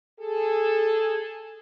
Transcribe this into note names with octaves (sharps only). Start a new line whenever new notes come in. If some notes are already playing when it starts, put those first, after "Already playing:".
G#4 A4